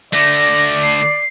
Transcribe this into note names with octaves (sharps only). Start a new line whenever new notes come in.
D3 A3 D5 A#6
C7